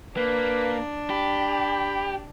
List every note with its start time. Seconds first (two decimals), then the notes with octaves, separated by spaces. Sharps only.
0.17 A#3 D4 B4
1.10 G4 B5